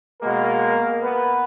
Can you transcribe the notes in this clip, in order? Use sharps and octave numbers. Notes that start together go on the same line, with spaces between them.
B2 G#3 A#3 B3 A#4
B3 B4